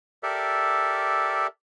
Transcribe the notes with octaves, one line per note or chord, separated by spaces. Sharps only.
G4 A4 A#4 D5 E5